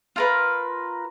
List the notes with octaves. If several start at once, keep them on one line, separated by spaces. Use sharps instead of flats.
F4 A#4 B4